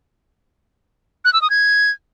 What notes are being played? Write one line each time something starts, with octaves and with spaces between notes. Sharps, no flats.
F#6
E6
D#6
G#6